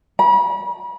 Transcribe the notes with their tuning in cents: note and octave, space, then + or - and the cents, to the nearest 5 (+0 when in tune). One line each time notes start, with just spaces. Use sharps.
B5 -40